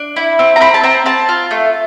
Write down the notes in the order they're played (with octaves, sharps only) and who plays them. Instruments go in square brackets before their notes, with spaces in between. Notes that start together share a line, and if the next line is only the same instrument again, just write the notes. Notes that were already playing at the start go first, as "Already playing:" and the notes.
Already playing: [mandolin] D4
E4
C4
A#5
C4 B5
A5
C4 A#5
C4 A5
F4
A3